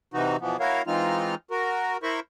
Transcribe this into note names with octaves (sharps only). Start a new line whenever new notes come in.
C3 E3 D#4 F#4
B2 E3 F3 B3
A#3 E4 F#4 A#4 C#5 F5
E3 G#3 C4 D#4 F4 F6
F#4 A#4
E4 A#4 C5 B5 C#6